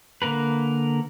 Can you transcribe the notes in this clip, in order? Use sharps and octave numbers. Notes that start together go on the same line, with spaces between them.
D3 A#3 A#4 B4